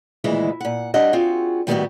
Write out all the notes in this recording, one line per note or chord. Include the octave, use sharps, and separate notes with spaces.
D2 A#2 D#3 E3 G#3 E4
A#2 F#5
G3 C4 D4 D#5 F#5
C4 F4 F#4 G#4
A2 D#3 G3 B3 E4 F#4